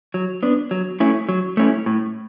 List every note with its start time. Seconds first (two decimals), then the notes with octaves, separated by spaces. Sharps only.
0.14 F#3
0.43 B3 D4
0.71 F#3
1.00 A3 C#4 E4
1.29 F#3
1.57 A3 C#4 E4
1.86 A2